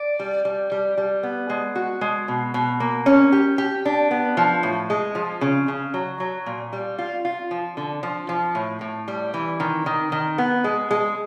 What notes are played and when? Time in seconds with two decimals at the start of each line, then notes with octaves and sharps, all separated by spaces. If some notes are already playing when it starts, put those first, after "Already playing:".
Already playing: D5
0.19 G3
0.45 G3
0.72 G3
0.97 G3
1.23 B3
1.50 G#3
1.75 F#4
2.01 G#3
2.28 B2
2.54 B2
2.80 A#3
3.06 C#4
3.32 G4
3.58 G4
3.85 D4
4.11 B3
4.37 F3
4.63 A2
4.90 G#3
5.15 F3
5.41 C#3
5.68 C#3
5.94 F#3
6.20 F#3
6.46 A#2
6.73 G3
6.98 F4
7.25 F4
7.51 F3
7.77 D3
8.03 F3
8.29 F3
8.55 A2
8.81 A2
9.08 G3
9.34 E3
9.60 D#3
9.86 D#3
10.12 D#3
10.38 B3
10.64 G#3
10.91 G#3